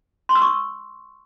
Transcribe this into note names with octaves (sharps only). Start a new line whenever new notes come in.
C6
E6
C#6